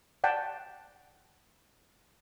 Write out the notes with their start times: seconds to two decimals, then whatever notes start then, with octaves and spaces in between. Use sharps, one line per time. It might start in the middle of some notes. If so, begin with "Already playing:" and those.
0.24 D5 F#5 G5 A5